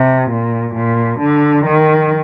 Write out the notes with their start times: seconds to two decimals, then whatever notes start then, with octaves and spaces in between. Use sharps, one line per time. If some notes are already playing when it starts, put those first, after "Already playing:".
Already playing: C3
0.29 A#2
0.75 A#2
1.20 D3
1.65 D#3